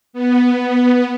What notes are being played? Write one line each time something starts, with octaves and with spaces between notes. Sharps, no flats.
B3